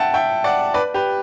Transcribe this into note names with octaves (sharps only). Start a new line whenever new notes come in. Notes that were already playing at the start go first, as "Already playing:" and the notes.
Already playing: E5 F#5 G5 A5
E5 G5
D5 F#5
B4 D5
G4 B4